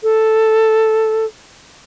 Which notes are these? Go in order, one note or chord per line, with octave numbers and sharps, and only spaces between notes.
A4